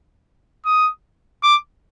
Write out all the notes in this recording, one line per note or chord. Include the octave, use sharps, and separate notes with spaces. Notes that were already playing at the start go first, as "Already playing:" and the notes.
D#6
D6